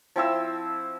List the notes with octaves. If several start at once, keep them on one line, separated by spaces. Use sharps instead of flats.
F3 C4 E4 E6